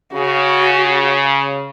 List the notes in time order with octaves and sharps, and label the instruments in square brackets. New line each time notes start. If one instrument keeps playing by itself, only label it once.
[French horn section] C#3 [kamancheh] F#4